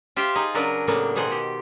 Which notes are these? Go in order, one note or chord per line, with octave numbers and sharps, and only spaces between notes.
F4 G4 C5 E5 F5 G5
D#4 G#4
C#3 F#3 D4 A#4 B4
A2 C#3 A#3 B3 D4
B2 D#3 G#4 C5 F#5
G4